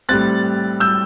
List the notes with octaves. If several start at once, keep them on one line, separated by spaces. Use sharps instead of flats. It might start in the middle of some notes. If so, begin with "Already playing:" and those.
A2 G3 C4 F#6 A6
E6 G6